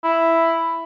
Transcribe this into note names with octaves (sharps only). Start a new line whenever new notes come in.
E4